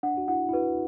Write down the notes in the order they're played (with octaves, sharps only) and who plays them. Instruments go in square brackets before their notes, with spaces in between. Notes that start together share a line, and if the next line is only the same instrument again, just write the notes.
[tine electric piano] D4 [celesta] F#5
[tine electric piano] F#4
[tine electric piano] E4 [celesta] F#5
[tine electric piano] E4
[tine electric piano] F#4 [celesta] B4